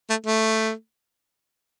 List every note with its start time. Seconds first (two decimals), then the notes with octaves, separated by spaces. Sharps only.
0.10 A3
0.26 A3